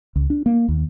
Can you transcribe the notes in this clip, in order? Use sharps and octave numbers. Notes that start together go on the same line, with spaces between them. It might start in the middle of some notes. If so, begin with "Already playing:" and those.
C#2
D4
A#3
D#2